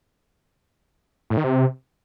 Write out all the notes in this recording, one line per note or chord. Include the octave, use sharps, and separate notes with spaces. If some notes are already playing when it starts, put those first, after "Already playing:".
A2
D#3
C3